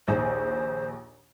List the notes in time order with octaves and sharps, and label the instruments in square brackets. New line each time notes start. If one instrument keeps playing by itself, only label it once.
[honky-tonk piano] A#1 D#2 G#4 [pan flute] C5